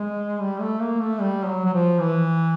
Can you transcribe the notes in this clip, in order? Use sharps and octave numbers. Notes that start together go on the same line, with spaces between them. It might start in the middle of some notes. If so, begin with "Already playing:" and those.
Already playing: G#3
G3
A3
A#3
A3
G3
F#3
F#3
F3
E3